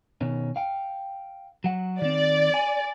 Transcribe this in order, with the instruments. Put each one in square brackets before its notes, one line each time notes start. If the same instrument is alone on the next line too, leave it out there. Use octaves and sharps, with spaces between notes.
[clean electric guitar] B2 D#3 C#4
F5 G5
F#3 F#5
[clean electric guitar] D#3 C4 [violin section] D5
[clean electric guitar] G#5